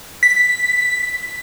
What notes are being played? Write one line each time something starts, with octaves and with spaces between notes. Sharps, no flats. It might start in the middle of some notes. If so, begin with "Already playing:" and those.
B6